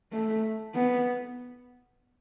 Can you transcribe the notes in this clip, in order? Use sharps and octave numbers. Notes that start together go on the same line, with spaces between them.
A3
B3